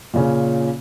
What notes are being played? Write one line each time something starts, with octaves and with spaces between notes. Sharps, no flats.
A#2 C#3 C#4